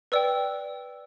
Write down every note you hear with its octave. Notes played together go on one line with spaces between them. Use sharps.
B4 D5 G5 E6